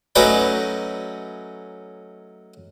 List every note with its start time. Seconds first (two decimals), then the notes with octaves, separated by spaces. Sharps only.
0.16 F#3 A3 C#4 D#4 B4 D5